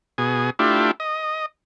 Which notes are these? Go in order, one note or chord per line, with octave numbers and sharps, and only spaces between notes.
B2 G#4
A3 D4 E4 F4 G4
D#5